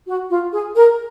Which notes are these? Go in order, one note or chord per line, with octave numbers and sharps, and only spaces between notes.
F#4
F4
G#4
A#4